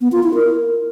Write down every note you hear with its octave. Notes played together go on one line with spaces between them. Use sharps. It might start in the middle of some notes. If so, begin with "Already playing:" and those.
B3
F4
E4
A#4